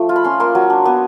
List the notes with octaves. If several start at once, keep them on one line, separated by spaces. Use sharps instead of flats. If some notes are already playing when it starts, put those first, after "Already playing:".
Already playing: F3 A3
F4
B5
C#4 C6
A#3 C6
F#3
D4
B3